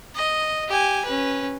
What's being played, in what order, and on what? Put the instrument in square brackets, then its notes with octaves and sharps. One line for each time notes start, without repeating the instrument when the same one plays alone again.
[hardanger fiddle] D#5
G4 G#5
C#4 B4